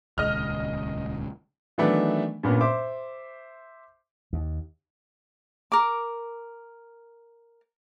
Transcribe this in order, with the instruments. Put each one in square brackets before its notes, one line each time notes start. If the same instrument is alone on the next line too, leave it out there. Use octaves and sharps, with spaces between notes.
[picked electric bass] D#1 C#2 [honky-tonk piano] D#5 F6
[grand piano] D#3 E3 F#3 A3 B3 D4
G2 A#2 B3 C#4
C5 E5 C6 D6
[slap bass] D#2
[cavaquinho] A#4 D6